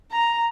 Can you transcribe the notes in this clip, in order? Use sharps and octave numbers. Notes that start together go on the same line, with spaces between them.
A#5